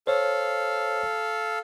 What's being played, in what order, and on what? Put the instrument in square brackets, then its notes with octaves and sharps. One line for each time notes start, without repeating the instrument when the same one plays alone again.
[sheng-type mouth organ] A4 F5 [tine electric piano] C5 C#5